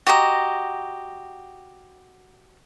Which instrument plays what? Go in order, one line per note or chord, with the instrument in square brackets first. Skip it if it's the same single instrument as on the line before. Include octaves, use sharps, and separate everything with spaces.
[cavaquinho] F#4 G4 D#5 A#5